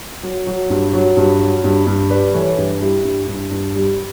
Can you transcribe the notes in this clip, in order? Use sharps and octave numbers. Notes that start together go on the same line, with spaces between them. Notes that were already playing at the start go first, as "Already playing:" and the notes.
F#3
F#3
G2
F#3
G2
F#3
G2
G2
G3 B4 D5
E3 A4 C#5
G2 G4 B4
G3 E4 G4
G2
G2
G2
G3